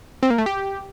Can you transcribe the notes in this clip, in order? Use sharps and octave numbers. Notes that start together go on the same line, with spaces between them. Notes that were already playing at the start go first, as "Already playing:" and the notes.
C4
A#3
A3
G4